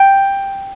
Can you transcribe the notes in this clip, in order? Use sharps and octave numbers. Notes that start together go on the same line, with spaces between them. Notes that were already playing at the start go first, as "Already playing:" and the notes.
Already playing: G5